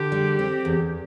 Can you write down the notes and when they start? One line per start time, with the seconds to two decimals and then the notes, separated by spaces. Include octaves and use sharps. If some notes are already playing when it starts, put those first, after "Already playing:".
Already playing: D3 G4
0.12 G3
0.39 C4
0.65 E2